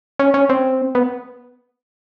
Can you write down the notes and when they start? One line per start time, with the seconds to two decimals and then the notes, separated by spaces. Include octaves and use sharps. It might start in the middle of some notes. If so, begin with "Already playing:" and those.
0.19 C#4
0.34 C#4
0.50 C4
0.95 B3